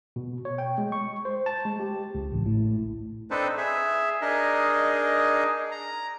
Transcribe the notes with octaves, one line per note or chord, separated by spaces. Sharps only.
B2
C#5
G5
G#3
C#6
C5
A5
G#3
G4
C#2
A1
A2
C4 D4 D#4 A4 B4 C5
G#4 E5
D4 D#4 G#4 A#4 D#5
A#5